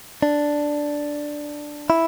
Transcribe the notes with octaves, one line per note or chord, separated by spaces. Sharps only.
D4
E4